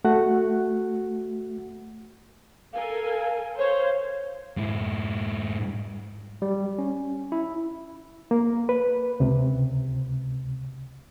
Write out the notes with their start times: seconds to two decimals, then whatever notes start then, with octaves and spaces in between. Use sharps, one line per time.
0.05 A3 F#4 F#5
2.74 A4 A#4 F5 G#5
3.58 C5 C#5 F5
4.57 G#2 E4
6.42 G3
6.78 C#4
7.32 E4
8.31 A#3
8.69 B4
9.20 C#2 C3